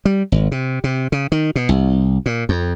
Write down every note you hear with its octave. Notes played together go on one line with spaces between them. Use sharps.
G3
G#1
C3
C3
C#3
D#3
B2
C2
A#2
F2